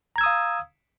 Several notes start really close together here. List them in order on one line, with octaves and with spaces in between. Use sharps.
A#5 G#6 E6 D#6 F5